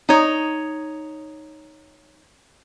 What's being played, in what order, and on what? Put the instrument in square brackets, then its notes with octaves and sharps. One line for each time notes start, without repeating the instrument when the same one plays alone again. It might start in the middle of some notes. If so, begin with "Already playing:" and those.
[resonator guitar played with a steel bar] D#4 C#5